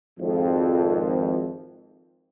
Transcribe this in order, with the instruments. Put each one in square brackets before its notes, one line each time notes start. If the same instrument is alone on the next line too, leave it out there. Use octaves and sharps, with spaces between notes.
[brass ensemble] G#1 F2